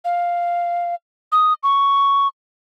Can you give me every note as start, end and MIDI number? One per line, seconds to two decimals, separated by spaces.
0.05 0.95 77
1.32 1.53 87
1.63 2.28 85